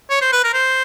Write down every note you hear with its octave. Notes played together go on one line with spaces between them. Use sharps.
C#5
C5
B4
A#4
C5